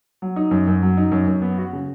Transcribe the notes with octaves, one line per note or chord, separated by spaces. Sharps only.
F#3
D#4
F#2
F#2
F#3
D#4
F#2
F#2
B3
F#4
C#3